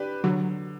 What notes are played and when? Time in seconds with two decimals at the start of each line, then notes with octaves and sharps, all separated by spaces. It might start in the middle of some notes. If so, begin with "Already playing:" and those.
Already playing: D4 G4 B4
0.24 D3 F#3